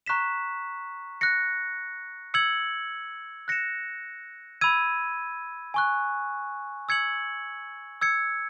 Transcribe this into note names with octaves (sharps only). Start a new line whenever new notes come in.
A#5 C#6 F#6 B6 E7
F#6 A#6 C#7
E6 G#6 C#7 F#7
F#6 A#6 C#7 E7
B5 E6 G#6 D#7
G#5 C#6 F#6
E6 G#6 C#7 F#7
E6 G#6 C#7